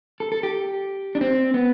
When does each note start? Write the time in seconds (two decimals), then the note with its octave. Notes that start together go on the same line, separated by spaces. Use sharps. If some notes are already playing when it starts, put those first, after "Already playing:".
0.20 A4
0.32 A4
0.43 G4
1.15 D4
1.21 C4
1.54 B3